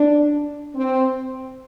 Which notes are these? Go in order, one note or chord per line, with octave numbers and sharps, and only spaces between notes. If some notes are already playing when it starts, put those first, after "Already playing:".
Already playing: D4
C4